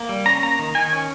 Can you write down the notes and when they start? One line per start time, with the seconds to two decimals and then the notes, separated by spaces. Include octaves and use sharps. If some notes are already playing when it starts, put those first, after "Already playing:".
Already playing: A#3
0.09 G3
0.26 C#4 A#5
0.42 A#3 A#5
0.59 D#3
0.75 D#3 G#5
0.93 C#4